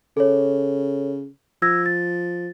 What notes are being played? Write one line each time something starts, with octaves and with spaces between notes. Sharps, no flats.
C#3 A4 C#5
F3 E6 G#6 A#6
A6